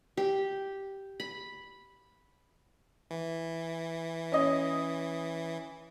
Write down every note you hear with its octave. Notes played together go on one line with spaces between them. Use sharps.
G4
B5
E3
C#4 D#5